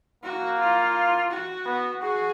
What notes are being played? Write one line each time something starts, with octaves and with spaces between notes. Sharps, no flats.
A#3 F#4
F4
F#4
B3
F#4 G#4